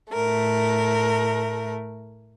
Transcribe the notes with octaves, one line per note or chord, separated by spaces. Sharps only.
A2 A3 A#4